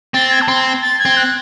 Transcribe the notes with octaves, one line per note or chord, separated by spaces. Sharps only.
C4 A6
G#6
A5
C4 C6
A6
G#6
C4
F#6